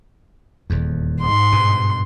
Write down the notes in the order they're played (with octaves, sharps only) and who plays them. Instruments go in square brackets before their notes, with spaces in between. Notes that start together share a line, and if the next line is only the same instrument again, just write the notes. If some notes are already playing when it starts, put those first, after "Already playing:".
[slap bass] D#1 E2
[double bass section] G#2 [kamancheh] C6
[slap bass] G2 B2